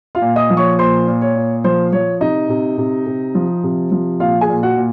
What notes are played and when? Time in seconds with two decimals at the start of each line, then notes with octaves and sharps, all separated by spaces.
0.15 F4 F5
0.21 A#2
0.36 D#5 D#6
0.50 F3
0.57 C#5 C#6
0.79 A#2 C5 C6
1.07 A#2
1.21 C#5
1.36 A#2
1.64 F3 C5
1.92 F3 C#5
2.21 C3 D#4 D#5
2.49 C3
2.78 C3
3.06 C3
3.35 F3
3.63 C3
3.92 F3
4.20 A#2 F4 F5
4.41 G#4 G#5
4.49 A#2
4.63 F#4 F#5
4.77 A#2